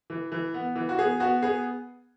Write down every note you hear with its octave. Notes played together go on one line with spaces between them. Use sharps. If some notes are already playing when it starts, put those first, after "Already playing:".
E3
E3
B3
E3
F#4
B3 G#4
B3 F#4
B3 G#4